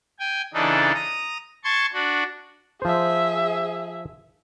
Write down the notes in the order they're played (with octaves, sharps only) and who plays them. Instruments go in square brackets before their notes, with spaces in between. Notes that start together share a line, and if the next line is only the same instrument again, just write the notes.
[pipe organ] G5 G#5
C#3 E3 D4 D#4 A4
A#5 D#6
A5 C6 C#6 G#6
D4 F#4
[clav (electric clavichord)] F3 C5 [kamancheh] G#4 E5